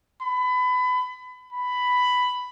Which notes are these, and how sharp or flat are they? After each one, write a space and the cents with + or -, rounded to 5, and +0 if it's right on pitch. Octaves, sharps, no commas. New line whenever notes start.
B5 +25
B5 +10